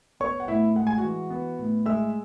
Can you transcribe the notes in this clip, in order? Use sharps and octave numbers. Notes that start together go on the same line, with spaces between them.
B3 C#5 C#6
F#5
A2 E4 E5
G#3 F#5
G#5
F#4 F#5
E3
B3
A2
G#3 E5 E6